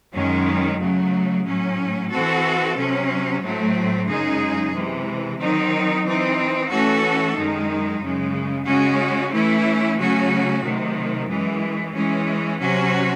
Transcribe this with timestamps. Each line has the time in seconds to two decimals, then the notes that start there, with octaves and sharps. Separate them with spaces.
0.14 F#2 D#3 G#3 C#4
0.80 C#3 F#3 A3
1.46 A2 F#3 C#4
2.11 E3 C4 F#4 A4
2.76 C3 F#3 C#4
3.42 A2 F#3 A3 C4
4.07 F#2 C#3 G#3 D#4 G#4
4.73 C3 E3 G#3
5.39 D#3 F#3 C4 D#4
6.04 E3 C4 D#4
6.69 E3 A3 C#4 F#4 A4
7.35 F#2 D#3 G#3 D#4
8.01 F#2 C#3 G#3
8.66 C#3 G#3 C#4 F#4
9.32 E3 A3 C#4 E4
9.97 C#3 F#3 A3 C#4 F#4
10.63 C3 D#3 F#3 A3
11.28 F#2 E3 G#3
11.94 E3 G#3 C#4
12.60 C3 F#3 C#4 F#4